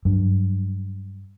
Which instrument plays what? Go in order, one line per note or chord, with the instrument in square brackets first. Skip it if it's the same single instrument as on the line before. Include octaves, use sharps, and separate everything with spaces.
[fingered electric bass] G2 F#3 G3 D4